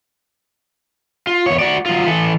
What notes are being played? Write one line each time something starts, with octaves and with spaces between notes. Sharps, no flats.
F4
E2 C#5
F#4 D5
F#3 F4
E3 A4